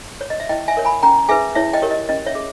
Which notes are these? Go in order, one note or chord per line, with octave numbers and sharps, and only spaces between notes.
C#5
D#5
E5
E4 D#5 G5
E5 G#5
A#4 C#5
G#5 B5
C#4 G5 A#5
G#4 B4 E5 G#5
E4 C#5 E5
D#5 G5
G4 A#4 C#5
D#5
C#4 D#5
C#5 E5
G#4